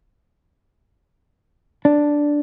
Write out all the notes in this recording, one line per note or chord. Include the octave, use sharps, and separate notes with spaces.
D4